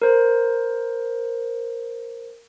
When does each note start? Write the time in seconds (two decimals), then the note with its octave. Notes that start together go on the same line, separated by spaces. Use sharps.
0.02 A#4 C5